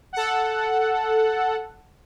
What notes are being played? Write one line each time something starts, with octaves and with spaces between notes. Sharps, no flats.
A4 F#5